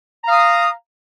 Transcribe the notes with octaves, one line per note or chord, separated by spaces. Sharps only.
F5 A#5 D#6